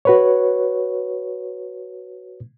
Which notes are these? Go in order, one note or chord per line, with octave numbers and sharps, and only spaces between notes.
F#4 B4 C#5